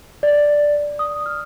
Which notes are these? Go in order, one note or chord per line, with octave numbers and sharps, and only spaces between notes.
D5
D#6
F6